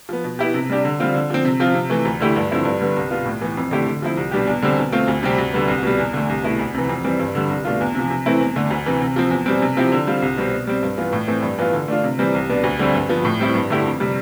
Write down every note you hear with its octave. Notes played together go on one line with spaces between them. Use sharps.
F3 B3
B2
B3 E4 G4
C3
G3 D4 G4
D3
G3 C4 F4
D3
F3 C4
C3
F3 C4 F4
C3
E3 A3
D2
D3 A3 E4 G4
G2
D3 F3 C4 E4
G2
D3 G3 B3
C2
B2 B3 F4
A2
E3 B3
F2
D3 A3 E4 G4
D3
F3 C4 E4
C2
B2 G3 D4 G4
E2
D3 G3 C4
B2
A3 C4 F4
D2
C3 G3 C4 G4
D2
D3 G3 B3
C2
B2 G3
E2
D3 A3
C2
B2 A3 E4
D2
C3 E3
F2
E3 G3 C4
G2
D3 G3 D4
C2
B2 A3 D4 F4
E2
C3 F3
C3
E3 A3 C4 E4
E2
D3 A3
D2
C3 E3
C3
F3 C4
E2
B2 G3 C4
C3
F3 C4 E4 G4
D3
G3 C4 F4
C2
B2 G3 C4
B2
G3 C4
G2
E3 B3 F4
A2
E3 A3 C4
G2
E3 B3 F4
D3
A3 D4 F4
C3
E3 G3 C4
C2
B2 B3 D4
D2
D3 G3 C4
G2
F3 B3
A2
G3 C4 E4
G2
D3 A3 E4 G4
F2
C3 G3